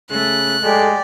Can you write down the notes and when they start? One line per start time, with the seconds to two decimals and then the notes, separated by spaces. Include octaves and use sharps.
0.11 C#3 A3 F#6
0.64 G#3 G4 A4 D5